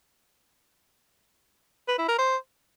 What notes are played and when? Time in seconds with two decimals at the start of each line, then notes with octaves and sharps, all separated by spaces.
1.88 B4
1.98 E4
2.08 A#4
2.18 C5